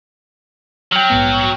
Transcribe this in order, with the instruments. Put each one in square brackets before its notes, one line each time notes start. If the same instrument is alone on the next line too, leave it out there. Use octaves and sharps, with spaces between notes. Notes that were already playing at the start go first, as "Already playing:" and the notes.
[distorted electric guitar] F#3 [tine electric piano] G5 F6
[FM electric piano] A#1 G#2 B3